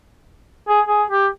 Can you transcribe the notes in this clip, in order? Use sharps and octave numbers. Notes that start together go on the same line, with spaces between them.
G#4
G#4
G4